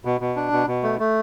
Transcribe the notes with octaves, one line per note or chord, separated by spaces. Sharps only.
B2
B2
D4
B2
B2
A3
A3